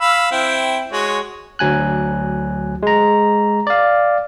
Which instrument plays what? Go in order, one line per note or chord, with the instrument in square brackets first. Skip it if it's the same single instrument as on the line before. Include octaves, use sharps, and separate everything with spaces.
[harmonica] F5 B5 E6
C4 E4 G5
G#3 F#4 C#5
[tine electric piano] D2 F#3 G#5 F#6
G#3 A#5
D5 F5